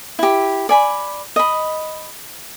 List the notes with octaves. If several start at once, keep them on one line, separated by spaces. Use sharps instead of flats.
E4 G4
D5 G#5 B5
D#5 B5